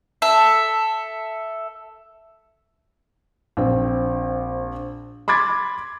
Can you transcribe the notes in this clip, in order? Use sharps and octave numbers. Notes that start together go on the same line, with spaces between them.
A4 E5
A#1 C4
B5 C6 D6 G#6 A6